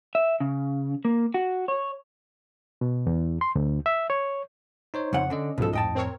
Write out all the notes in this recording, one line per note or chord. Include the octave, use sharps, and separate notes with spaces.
E5
C#3
A#3
F#4
C#5
B2
E2
C6
D2
E5
C#5
D#4 C5 C#5
F2 C#3 F#5
D3 C#4 D4 D#5
C2 G#2 B2 F3 A4
F2 A2 D#5 G5 A5
C4 A#4 C#5